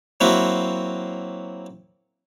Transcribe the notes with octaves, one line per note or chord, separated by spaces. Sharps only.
F#3 A#3 C4 E4 F#4